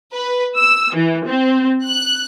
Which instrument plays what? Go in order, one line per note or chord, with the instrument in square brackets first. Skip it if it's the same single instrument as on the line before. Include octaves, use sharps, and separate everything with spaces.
[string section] B4
E6
E3
C4
F#6